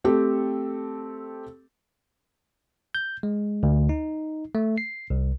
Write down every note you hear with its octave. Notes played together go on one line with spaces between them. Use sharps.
A3 C4 G4 A4
G6
G#3
D2
D#4
A3
C7
C2